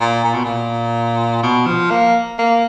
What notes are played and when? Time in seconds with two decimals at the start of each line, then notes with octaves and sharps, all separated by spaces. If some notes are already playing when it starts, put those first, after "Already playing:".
0.01 A#2
0.24 A#2
0.34 B2
0.45 A#2
1.43 B2
1.67 F3
1.91 A#3
2.38 A#3